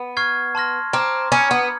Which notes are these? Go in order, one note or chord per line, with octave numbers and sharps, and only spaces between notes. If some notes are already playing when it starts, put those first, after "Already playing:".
Already playing: B3
C#6 F6 G#6 C7
A5 C6 F6 A#6
C4 A#5 D6 F6
C#4 B5 D#6 G#6 C#7
B3